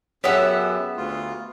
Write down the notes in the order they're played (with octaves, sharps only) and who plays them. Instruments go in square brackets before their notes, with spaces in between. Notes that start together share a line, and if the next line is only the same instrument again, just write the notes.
[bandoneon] F#2 [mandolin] B3 E5 F#5 [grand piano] G4 G#4 E6 [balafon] C#5
[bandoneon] D2 F4